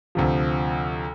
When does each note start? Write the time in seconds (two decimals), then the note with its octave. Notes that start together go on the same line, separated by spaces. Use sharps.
0.15 D2 C3 F3